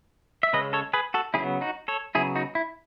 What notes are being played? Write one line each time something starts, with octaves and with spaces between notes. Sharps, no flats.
E5
C#3 G#3 C#4 B4 D#5
A4 C#5
G#4 B4
F#4 A4
C#3 F#3 B3 E4 G#4
D#4 F#4
A4 C#5
C#3 F#3 B3 E4 G#4
D#4 F#4
E4